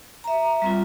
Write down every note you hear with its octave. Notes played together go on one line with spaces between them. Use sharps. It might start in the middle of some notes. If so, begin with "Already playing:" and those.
E5 A#5
G3 C4 F4